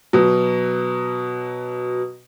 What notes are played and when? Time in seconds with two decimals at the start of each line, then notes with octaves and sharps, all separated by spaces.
0.13 B2 F#3